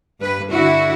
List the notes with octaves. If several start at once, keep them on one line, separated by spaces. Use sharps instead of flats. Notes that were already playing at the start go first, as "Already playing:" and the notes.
G2 B4
D3 E4 F#4